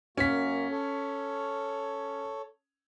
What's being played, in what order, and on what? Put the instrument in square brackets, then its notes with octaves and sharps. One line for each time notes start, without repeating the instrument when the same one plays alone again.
[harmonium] F#2 A#3 F#4 [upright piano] C#4 B6
[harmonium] A4 C#5